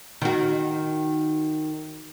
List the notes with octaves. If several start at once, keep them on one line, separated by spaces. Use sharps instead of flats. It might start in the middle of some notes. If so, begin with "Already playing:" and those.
D#3 F#4